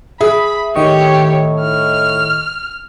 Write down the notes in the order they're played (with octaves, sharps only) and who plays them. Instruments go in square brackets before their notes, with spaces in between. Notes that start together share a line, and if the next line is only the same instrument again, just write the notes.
[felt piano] G#4 [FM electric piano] E5 [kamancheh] B5
[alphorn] A2 [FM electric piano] D#3 D#5 C#6 [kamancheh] G4 C#5
[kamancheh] F6